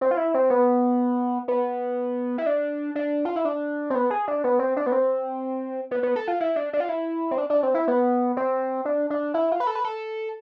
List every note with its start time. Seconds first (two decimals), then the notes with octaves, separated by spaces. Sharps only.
0.01 C4
0.11 F4
0.17 E4
0.34 C4
0.50 B3
1.48 B3
2.38 E4
2.46 D4
2.95 D4
3.25 F4
3.36 E4
3.45 D4
3.90 C4
3.95 B3
4.10 G#4
4.28 D4
4.44 B3
4.59 C4
4.76 D4
4.86 B3
4.92 C4
5.91 B3
6.03 B3
6.16 A4
6.28 F4
6.40 E4
6.56 D4
6.73 D4
6.80 F4
6.89 E4
7.31 C4
7.38 D4
7.50 D4
7.63 C4
7.75 E4
7.88 B3
8.37 C4
8.85 D4
9.10 D4
9.34 E4
9.52 F4
9.60 B4
9.67 A4
9.75 B4
9.84 A4